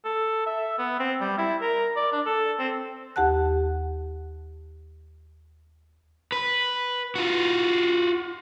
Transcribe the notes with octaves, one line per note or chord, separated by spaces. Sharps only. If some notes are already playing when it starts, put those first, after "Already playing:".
A4
E5
B3
C4
G3
E4
A#4
D5
D4
A4
C4
D#2 G4 F#5 A5 F#6
B4
F4 F#4